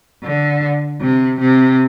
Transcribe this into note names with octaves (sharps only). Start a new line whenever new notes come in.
D3
C3
C3